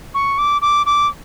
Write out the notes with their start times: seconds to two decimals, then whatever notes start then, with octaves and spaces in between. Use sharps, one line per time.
0.14 C#6
0.38 D6
0.62 D6
0.86 D6